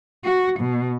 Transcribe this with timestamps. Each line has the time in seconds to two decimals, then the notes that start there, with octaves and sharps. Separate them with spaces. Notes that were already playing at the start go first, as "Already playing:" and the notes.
0.23 F#4
0.59 B2